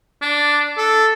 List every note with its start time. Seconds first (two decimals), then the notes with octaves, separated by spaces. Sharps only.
0.22 D4
0.77 A4